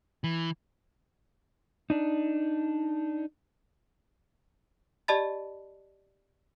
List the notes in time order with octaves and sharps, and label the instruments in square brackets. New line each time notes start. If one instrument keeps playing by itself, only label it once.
[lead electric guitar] E3
[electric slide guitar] D4 D#4
[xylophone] G4 D5 D#5 A5 B5 A6